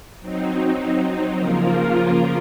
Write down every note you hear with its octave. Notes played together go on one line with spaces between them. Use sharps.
F#3 C4 D#4
C#3 F3 A#3 F4 A#4